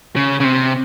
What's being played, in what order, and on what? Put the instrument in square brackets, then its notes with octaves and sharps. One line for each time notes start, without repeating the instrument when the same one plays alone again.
[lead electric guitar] C#3
C#3
C3